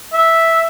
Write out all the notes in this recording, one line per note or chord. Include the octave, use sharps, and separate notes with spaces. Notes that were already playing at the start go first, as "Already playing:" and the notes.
E5